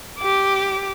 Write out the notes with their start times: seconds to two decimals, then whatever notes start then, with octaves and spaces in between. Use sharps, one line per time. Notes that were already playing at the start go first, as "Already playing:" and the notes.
0.18 G4 D6